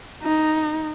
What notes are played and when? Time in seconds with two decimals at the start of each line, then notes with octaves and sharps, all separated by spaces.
0.23 D#4